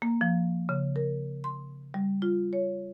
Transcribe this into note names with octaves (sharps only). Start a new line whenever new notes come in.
A#3
F3
C#3
A#4
C6
G3
F4
C#5